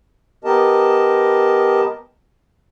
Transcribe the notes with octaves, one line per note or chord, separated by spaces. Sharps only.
B3 G4 A#4 D#5 A5